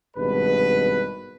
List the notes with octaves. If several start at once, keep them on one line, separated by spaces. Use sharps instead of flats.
G#1 G2 B2 B4